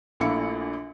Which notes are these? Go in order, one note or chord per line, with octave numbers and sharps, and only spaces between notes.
A#1 A#2 A3 E4 F5 C#7